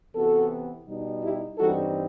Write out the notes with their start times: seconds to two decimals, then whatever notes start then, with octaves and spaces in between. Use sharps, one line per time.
0.15 C3 E3 B3 F#4 A4
0.87 B2 G3 D#4
1.23 E4 G4
1.58 G2 E3 G3 C4 D#4 F#4 A4